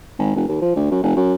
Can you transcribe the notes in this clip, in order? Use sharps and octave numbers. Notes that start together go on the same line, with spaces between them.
G#1
F1
D#2
F3
D2
F#2
F1
F#2